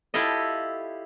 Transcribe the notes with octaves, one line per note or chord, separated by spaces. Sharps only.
E4 F4 G4 A4 D#5